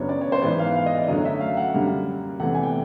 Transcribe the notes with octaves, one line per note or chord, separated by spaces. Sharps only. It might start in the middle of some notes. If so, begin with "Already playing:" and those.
Already playing: F#2 C#3 F#3 B3 D4 C#5
D5
C#5
C5
G#2 E3 G#3 B3 D5
F5
F5
D#5
D5
F#2 D3 F#3 A3 C#4 D#5
E5
F5
F#5
F#2 D3 G3 A#3
E2 C3 E3 A3 F#5
G#5
G5